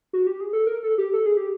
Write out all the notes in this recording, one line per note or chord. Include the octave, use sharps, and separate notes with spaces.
F#4
G4
G#4
A4
A#4
A4
G4
A4
G#4
G4